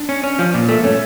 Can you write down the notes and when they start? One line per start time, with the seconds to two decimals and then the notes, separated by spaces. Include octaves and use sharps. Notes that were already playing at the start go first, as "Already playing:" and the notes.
Already playing: D4
0.09 C#4
0.24 C#4
0.39 F3
0.54 A#2
0.69 A3
0.84 A3 C#4